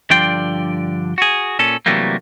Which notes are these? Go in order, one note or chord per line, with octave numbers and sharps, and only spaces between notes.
G2 D3 F3 D5 G5 C6
F#4 G#4
A#2 C#4 A4
C3 E3 F#3 G3 A3 A#3